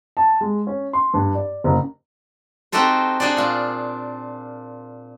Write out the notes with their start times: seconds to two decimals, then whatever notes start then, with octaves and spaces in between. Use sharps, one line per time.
0.17 A5
0.41 G#3
0.67 C#4
0.93 C6
1.14 G2
1.35 D5
1.64 F#1
2.72 C4 D#4 F#4 G4 A4 C5
3.20 D4 F#4 G#4 C5 D5
3.37 A#2 F4